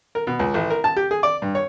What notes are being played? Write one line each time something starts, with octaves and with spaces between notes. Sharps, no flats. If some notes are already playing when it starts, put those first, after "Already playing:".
A#4
B2
C#2
A1
A#4
A5
G4
G#4
D5
G2
C#5